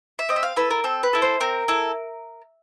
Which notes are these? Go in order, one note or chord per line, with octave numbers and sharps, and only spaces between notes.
E5
C4 D#5
E5
F5
E4 A4 B4
A#4
C4 A4
B4
E4 A4
C5
C4 A#4
E4 A4